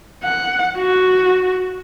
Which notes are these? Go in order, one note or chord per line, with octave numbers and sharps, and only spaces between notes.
F#5
F#4